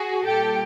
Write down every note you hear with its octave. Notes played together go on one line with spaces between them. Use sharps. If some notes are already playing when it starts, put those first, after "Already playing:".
Already playing: F#4 G#4
A#2 G3 G4 A4